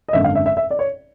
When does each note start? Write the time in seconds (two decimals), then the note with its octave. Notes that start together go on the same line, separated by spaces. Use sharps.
0.09 D#5
0.13 G#1 F#2 D3 E5
0.24 F5
0.35 E5
0.46 E5
0.57 E5
0.71 D5
0.79 C#5